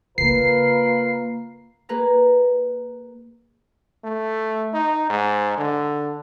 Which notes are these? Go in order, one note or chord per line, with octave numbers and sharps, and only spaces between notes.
C#3 A#3 F4 A#4 B4 C7
A#3 G#4 B4 A#5
A3
D#4
G#2
D3